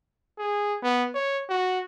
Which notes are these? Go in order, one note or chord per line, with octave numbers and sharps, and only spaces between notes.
G#4
B3
C#5
F#4